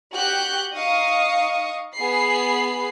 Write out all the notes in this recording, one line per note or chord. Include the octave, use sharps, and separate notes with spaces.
F#4 G4 F#6 G6
D#4 D#5 F5 C#6 D#6
B3 G#4 B5 C7